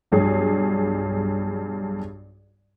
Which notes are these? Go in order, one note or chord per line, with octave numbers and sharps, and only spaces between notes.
B1 G2 G#4 C#5